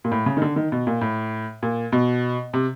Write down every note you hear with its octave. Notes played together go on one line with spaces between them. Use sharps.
A#2
A2
C#3
D#3
D3
D#3
B2
A#2
A2
A#2
B2
C3